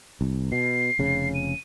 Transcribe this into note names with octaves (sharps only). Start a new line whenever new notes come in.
C2
B2 C7
F1 C#3
D#7